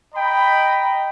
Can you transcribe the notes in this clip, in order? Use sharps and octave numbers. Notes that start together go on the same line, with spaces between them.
D#5 G5 A#5 B5